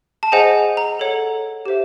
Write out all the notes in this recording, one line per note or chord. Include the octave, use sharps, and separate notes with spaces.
A5
G#4 C5 D#5 F#5 G#5
A#5
A4 C#5 F#5
G4 C5 E5